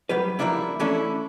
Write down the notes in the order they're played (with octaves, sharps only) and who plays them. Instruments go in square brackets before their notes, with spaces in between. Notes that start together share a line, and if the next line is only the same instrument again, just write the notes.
[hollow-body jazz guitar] F#3 G3 G4 B4
F3 G3 A#3 D4 E4
E3 A3 C#4 D4 E4 A4